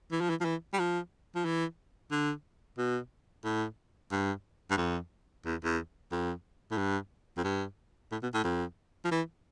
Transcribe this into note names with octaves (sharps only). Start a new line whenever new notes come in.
E3
F3
E3
F3
E3
G3
F3
F3
E3
D3
B2
A2
G2
G2
F2
E2
E2
F2
A2
G2
F2
G2
A2
B2
A2
F2
F3
E3